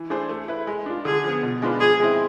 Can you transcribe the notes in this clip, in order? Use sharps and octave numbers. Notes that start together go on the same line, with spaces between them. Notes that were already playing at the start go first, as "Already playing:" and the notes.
Already playing: E3
A3 D4 G#4 C5
A3
E4 B4
G#3
D4 F4
D3 G#4
F3 B3
B2
G#3 D4 F4 B4
F3 G#4
G#3 C4 E4